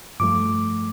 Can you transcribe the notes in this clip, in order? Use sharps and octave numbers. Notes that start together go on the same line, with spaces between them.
G2 F3 A3 D6